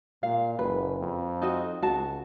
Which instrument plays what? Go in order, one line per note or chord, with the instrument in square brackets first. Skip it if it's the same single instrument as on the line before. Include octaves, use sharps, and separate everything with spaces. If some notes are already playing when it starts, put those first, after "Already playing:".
[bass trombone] A#2 [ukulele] F5
[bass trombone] F#1 [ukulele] B4
[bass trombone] F2
[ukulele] D#4 F#4 D#5
[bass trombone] C#2 [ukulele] F#4 A5